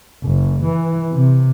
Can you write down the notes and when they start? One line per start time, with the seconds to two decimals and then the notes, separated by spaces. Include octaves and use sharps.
0.24 F#1
0.62 E3
1.12 C3